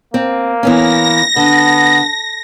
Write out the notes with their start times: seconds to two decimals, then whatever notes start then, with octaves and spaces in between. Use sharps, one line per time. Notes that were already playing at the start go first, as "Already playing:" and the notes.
0.14 A#3 C4
0.63 E3 B3 C#4 A#6
1.36 D3 B3